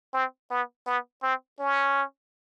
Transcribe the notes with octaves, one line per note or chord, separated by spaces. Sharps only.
C4
B3
B3
C4
C#4